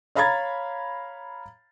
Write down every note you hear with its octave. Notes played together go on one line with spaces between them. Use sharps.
C#5 F5 A#5 B5 G#6 A6